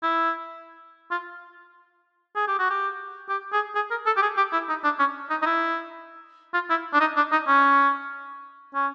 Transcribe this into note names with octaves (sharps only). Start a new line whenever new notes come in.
E4
F4
G#4
G4
F#4
G4
G4
G#4
G#4
A#4
A4
G4
G#4
G4
E4
D#4
D4
C#4
D#4
D#4
E4
F4
E4
D4
D#4
D4
D#4
C#4
C#4